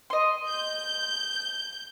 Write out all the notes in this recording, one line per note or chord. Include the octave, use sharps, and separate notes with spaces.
D#5 C6
G6